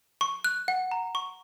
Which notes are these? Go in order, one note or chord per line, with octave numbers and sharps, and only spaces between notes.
C#6
F#6
F#5
A#5
C#6